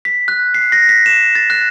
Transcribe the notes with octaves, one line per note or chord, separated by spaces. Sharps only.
B6
F#6
C7
A#6
B6
E7
A6
F#6